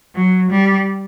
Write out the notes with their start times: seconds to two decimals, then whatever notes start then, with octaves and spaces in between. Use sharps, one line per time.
0.15 F#3
0.51 G3